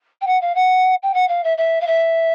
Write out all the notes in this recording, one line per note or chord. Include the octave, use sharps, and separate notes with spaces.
G5
F#5
F5
F#5
G5
F#5
F5
E5
E5
F5
E5